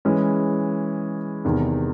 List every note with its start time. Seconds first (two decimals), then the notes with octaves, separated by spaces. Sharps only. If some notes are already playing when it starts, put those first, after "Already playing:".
0.05 E3 G#3 C#4
1.45 E2 C3 D#3